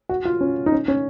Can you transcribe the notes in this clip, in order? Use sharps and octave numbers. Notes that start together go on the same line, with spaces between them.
F#4
F4
C#4
D#4
C#4
C#4